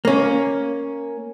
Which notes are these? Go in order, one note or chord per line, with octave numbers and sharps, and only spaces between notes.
A#3 C#4